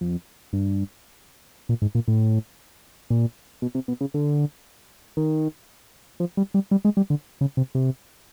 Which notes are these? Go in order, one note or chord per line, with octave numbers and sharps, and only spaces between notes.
F2
G2
A#2
G#2
A#2
A2
A#2
B2
C3
B2
C#3
D3
D#3
F3
G3
G3
G3
G#3
G3
D3
C#3
C3
C3